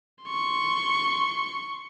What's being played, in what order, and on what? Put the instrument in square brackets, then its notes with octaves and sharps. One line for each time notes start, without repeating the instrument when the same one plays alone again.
[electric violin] C6 C#6